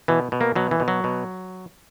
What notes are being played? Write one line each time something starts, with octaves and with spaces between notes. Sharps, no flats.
B2 E3
B2
A#3
B2 F#3
E3
B2
F#3
B2